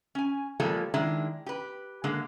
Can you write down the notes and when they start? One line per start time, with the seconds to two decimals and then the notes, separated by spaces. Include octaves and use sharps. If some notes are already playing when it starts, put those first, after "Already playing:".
0.15 C#4 G#5
0.60 F3 G3 G#3 A#3 A4
0.94 D#3 G#3 D4 E4
1.46 G4 B4
2.04 D3 G#3 A#3